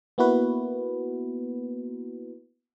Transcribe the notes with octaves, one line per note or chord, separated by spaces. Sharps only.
A#3 B3 E4 F#4 B4